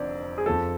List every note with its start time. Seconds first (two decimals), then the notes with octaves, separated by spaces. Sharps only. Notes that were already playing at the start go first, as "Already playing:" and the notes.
Already playing: F1 F2 D3 D5
0.38 G#4
0.46 F2 F3 A4